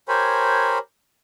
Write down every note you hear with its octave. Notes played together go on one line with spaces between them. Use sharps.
G4 A#4 C5 C#5 G#5 B5